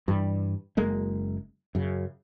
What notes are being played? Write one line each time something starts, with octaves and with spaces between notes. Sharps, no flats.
G2 E3 G3
F#1 G#3 A#3
F#2 C#3